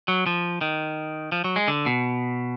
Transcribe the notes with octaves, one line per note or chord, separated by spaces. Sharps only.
F#3
F3
D#3
F3
F#3
G#3
D3
B2